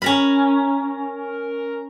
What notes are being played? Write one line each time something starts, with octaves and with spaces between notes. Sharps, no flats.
C#4 A#4 A#5 B5